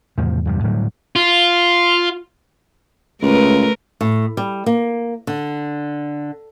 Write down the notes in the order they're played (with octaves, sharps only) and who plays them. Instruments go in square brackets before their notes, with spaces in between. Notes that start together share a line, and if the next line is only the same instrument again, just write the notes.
[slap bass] E2 A2 C3 F3
E2 G2 C3 G3
D1 A2 F#3 G3
[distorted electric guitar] F4
[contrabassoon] C#2 [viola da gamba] A3 A#4 B4
[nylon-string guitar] A2
G3
A#3
D3